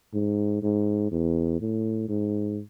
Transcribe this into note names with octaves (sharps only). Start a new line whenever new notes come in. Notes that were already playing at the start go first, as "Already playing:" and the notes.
G#2
G#2
E2
A2
G#2